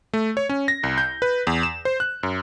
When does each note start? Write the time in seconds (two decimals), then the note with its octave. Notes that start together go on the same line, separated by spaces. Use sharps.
0.13 A3
0.37 C#5
0.49 C#4
0.68 A#6
0.83 C2
0.98 G6
1.22 B4
1.47 E2
1.63 E7
1.85 C5
2.00 F#6
2.23 F#2